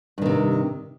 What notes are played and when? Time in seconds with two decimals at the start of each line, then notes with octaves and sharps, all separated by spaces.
0.18 G2
0.22 D#3
0.26 C3